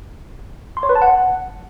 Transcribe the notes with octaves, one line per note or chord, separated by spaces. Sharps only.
C6
C#5
B4
A5
F#5